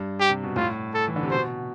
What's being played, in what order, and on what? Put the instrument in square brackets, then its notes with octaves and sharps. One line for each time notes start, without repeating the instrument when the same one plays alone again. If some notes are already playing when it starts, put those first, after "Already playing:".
Already playing: [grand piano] G2
[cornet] G4
[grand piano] C3
B2
[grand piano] A2 [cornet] F4
[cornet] A4
[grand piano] E3
D3
C3
[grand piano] B2 [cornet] C5